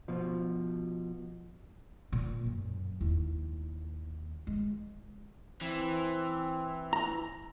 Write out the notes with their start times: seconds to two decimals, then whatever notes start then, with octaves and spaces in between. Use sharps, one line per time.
0.08 B2 F3
2.12 A#2
2.46 F#2
3.01 D#2 E4
4.47 G#3
5.61 E3 C4
6.93 A#5